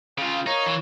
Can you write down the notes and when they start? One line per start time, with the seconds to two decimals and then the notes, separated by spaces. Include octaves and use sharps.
0.18 C#3 F4 G5
0.46 D#4 A#4 C#5 F5
0.66 E3